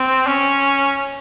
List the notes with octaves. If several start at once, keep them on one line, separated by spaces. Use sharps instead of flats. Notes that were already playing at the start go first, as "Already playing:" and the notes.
Already playing: C4
C#4